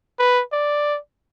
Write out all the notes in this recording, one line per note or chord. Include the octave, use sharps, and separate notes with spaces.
B4
D5